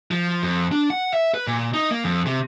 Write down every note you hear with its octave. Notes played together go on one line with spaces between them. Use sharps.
F3
F2
D4
F#5
E5
B4
A#2
D#4
A#3
F2
C3